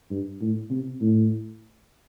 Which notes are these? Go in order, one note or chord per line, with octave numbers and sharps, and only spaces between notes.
G2
A2
C3
A2